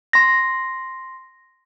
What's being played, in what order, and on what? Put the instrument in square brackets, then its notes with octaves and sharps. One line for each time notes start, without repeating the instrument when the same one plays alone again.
[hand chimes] C6 A#6